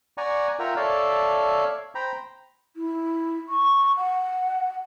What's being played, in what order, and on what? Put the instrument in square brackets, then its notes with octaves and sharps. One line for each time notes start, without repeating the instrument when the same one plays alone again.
[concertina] D5 F#5 G#5 A#5 C#6
F4 A#4 E5 F#5 G5 A#5
A4 C#5 D5 E5 F5 A5
C5 G5 A#5 B5
[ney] E4
C#6
F#5